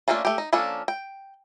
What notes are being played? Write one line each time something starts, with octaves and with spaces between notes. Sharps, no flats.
A3 A#3 C#4 D4 F4
A3 G4
D#4
F3 A#3 C#4 D4 A4
G5